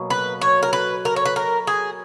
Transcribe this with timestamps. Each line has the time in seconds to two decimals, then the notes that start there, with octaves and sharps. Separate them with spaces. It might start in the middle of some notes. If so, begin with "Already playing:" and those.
Already playing: B2 F#3 A#3
0.10 B4
0.41 C#5
0.63 A#4
0.73 B4
1.05 A#4
1.16 C#5
1.25 B4
1.36 A#4
1.67 G#4